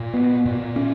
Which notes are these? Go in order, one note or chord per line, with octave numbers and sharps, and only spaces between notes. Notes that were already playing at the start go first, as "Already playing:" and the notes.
Already playing: A#2
B3
A#2
C#4